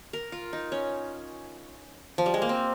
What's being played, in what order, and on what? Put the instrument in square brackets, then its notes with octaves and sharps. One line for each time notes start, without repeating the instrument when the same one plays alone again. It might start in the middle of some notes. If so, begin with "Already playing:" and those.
[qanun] A#4
F4
D#4
C#4
F3
G3
G#3
A#3
C4